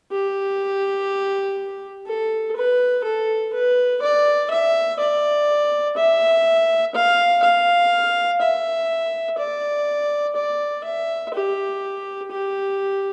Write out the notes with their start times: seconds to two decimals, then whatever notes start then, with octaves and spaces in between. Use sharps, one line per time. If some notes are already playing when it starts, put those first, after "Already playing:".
0.12 G4
2.07 A4
2.56 B4
3.04 A4
3.53 B4
4.02 D5
4.51 E5
5.00 D5
5.97 E5
6.95 F5
7.43 F5
8.41 E5
9.38 D5
10.36 D5
10.84 E5
11.34 G4
12.31 G4